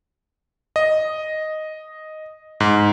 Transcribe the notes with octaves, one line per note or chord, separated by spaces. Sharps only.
D#5
G#2